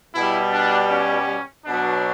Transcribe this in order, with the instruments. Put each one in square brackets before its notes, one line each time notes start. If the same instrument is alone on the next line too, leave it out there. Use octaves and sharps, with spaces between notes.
[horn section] B2 G3 E4
D4
C#4
B2 F#3 D4